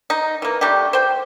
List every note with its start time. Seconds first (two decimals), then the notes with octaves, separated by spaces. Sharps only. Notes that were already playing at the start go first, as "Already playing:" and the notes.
0.10 D#4
0.42 E3 A#3
0.61 C3 G3 A3 G4
0.93 C5 G5